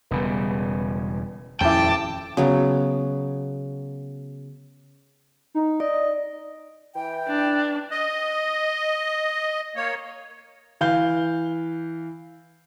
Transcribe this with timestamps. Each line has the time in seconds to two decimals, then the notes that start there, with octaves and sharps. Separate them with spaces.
0.11 E1 C#3 G3 B3
1.61 D#1 F2 C#4 E4 G5 A5 D6
2.37 C#3 F#3 B3
5.55 D#4
5.80 D5 D#5
6.95 E3 G5
7.27 D4
7.91 D#5
9.76 A#3 C#5
10.81 E3 F5 G6 G7